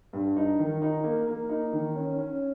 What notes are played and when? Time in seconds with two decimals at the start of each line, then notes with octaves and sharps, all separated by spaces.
0.13 G2
0.37 D#4
0.59 D#3
0.82 D#4
1.04 A#3
1.27 A#3
1.49 D#4
1.73 D#3
1.95 C#4
2.18 C#4